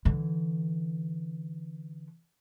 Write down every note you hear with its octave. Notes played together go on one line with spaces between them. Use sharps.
D3 E3